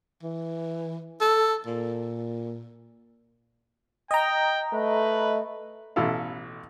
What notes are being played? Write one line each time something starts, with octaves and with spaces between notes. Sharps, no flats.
E3
A4
A#2
D#5 G5 A#5
A3 B4
A1 B2 E4 A4 F5